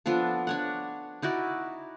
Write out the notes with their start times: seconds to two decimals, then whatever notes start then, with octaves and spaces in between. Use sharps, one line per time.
0.06 F3 B3 D4 A4
0.47 D4 C#5 F#5
1.22 D#4 E4 F#4 D5